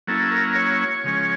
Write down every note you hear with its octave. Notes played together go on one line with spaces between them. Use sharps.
F#3 A#3 C#4 E4 A4
A#4
C#5
C#3 F3 G#3 C#4